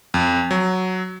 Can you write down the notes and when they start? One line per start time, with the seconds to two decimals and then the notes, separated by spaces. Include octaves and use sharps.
0.14 F2
0.51 F#3